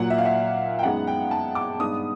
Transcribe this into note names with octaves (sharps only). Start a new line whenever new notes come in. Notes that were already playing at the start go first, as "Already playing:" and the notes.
Already playing: A#2 F#3 A#3 F#5
E5
F5
E5
G5
F#2 D#3 G#3 B3 F#5
G5
A5
D6
G2 D#3 G#3 B3 D#6